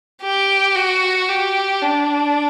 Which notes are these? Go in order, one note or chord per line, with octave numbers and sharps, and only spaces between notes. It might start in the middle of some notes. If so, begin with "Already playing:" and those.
G4
F#4
G4
D4